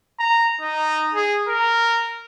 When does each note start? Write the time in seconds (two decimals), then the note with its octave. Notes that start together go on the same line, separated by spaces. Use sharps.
0.19 A#5
0.61 D#4
1.14 G#4
1.49 A#4